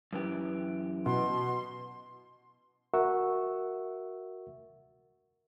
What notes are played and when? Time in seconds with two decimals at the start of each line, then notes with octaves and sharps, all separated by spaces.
0.13 F#2 E3 G4
1.06 B2 C6
2.94 F#4 A#4 E5 F#5 C#6 E6